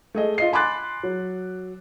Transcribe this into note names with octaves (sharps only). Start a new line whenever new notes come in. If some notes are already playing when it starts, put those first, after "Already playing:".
A3 G#4 D#5
F4 D#5 C7
G#5 B5 C6 D6 F#6 A6
F#3